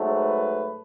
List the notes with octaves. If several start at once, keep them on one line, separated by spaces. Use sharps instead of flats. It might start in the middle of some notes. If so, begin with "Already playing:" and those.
Already playing: G#2 F#3 A3
B4